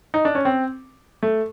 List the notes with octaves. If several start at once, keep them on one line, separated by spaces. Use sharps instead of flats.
D#4
D4
C#4
C4
A3